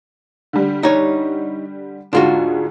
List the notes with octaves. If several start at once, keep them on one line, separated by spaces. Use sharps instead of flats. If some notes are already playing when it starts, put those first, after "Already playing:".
D3 G3
D#4 C#5
D2 G#2 G#3 D4 F4 F#4